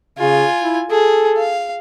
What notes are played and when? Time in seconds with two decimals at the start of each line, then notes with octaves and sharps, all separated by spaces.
0.19 C#3 F4 G#5
0.61 E4
0.90 G#4 A4
1.37 F5